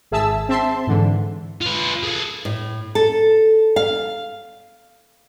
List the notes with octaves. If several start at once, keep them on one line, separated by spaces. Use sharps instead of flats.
G#1 G#4 E5 A5 E6
C4 E5 A5 C6
G#2 D3 E3
F4 B4
G#4 A4
A2
A4
F5